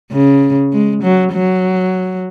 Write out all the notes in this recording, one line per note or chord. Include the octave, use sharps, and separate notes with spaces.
C#3
G#3
F#3
F#3